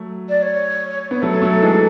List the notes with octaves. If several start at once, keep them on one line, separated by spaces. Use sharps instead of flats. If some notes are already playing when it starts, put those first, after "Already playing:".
Already playing: F#3 A3
D5
C#5
B3
F#3 A3 A4
F#3 A3
E3 G#3